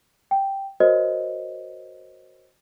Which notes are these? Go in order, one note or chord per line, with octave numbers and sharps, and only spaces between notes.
G5
F#4 A#4 C5 C#5 D#5